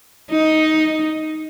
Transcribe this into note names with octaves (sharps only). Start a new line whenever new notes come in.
D#4